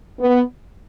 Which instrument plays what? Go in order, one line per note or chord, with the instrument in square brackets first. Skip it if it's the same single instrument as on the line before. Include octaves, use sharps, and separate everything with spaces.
[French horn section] B3